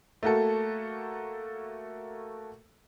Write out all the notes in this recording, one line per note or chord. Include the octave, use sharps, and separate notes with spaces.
A3 A#3 F#4 A4